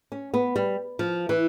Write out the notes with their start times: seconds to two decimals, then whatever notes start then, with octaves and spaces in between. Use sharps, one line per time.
0.12 C#4
0.34 B3
0.56 G3
0.99 F3
1.29 E3